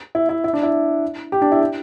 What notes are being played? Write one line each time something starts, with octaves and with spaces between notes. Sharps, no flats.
E4
E4
E4
D4
E4
G4
D4
E4
G4